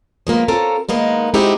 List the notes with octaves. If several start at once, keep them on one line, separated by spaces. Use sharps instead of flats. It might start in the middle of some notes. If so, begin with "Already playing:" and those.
F3 G#3 A#3 B3
C4 F4 A4 A#4 C#5
D#3 G#3 A#3 B3 D#4
G#3 C4 D#4 E4 F#4 G4